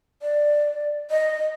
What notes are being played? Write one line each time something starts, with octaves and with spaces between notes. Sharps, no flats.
D5
D#5